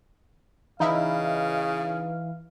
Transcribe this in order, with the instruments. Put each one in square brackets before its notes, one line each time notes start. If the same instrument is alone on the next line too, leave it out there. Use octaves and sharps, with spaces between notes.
[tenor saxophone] C#3 [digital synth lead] E3 [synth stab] D#4 E4 [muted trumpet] F5